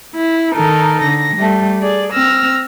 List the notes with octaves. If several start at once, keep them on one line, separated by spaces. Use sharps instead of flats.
E4
D#3 D#4 A4 A#4
D3 A#6
G3 A3
G#4 D5
C4 E6 F6 A#6